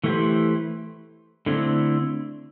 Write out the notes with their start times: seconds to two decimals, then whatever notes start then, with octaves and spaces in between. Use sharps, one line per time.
0.04 E3 A3 E4 G4 C5
1.46 D3 A3 C4 E4